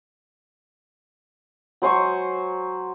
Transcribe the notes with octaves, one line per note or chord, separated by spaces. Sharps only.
F#3 C5 G#5 C#6